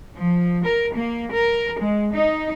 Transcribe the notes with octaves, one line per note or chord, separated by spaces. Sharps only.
F3
A#4
A#3
A#4
G#3
D#4